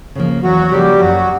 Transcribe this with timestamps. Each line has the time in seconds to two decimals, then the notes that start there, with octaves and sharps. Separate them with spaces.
0.15 C#3 F3 A#3
0.43 E2 F#3 F#4
0.71 C#3 F3 G3 A#3 G4
0.99 F#2 F#3 F#4